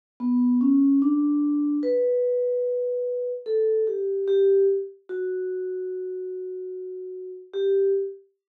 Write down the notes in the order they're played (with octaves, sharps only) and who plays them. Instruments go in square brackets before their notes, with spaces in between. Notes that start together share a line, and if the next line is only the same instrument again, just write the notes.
[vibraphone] B3
C#4
D4
B4
A4
G4
G4
F#4
G4